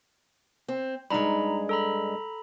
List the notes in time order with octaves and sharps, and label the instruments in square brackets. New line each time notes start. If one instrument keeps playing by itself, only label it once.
[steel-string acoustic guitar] C4
[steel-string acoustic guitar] G2 G#3 [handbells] D#4 A#5 B5
[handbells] A4 A#5 B5